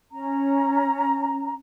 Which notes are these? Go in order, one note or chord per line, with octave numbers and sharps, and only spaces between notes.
C#4 A#5